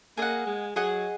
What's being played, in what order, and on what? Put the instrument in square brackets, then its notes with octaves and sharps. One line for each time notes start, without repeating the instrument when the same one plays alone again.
[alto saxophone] A#3 [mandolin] G#4 D#5 F#5
[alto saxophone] G#3
[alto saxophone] F#3 [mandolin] G#4 D#5 F#5